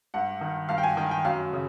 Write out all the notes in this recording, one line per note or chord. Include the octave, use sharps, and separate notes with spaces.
G2 F#5
D#3
G2 F5
G5
G#5
D#3 G5
G5
F#2 F5
C#3